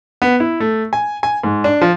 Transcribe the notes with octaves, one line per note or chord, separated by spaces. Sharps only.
B3
E4
A3
G#5
G#5
G#2
D4
F3